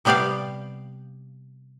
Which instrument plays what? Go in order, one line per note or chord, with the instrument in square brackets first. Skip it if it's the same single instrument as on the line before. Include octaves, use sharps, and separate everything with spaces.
[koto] C3 G3 B3 G4 D5 F5